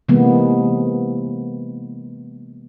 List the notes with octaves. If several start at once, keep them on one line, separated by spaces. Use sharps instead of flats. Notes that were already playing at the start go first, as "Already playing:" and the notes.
C3 E3 G#3 A#3 B3